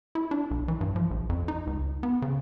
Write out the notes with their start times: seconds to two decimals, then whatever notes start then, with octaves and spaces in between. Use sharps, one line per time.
0.15 E4
0.31 D4
0.51 B1
0.68 E3
0.81 G2
0.96 F3
1.11 A#1
1.29 F2
1.48 D#4
1.67 C#2
2.03 B3
2.22 C#3